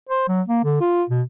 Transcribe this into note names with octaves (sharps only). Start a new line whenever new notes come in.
C5
F#3
A#3
D3
F4
B2